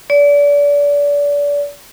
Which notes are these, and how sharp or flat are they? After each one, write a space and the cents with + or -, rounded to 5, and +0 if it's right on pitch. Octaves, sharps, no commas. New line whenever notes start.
D5 -30